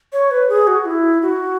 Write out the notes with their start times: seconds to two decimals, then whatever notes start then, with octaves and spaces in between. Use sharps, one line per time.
0.13 C#5
0.31 B4
0.49 G#4
0.67 F#4
0.86 E4
1.22 F#4